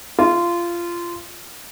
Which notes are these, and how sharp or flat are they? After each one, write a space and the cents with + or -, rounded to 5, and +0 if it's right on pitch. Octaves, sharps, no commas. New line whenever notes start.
F4 -20